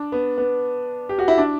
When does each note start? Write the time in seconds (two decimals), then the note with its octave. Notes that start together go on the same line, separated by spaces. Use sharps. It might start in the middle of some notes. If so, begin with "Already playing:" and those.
Already playing: D4
0.12 B3
0.38 B3
1.09 G4
1.19 F#4
1.28 E4
1.38 D4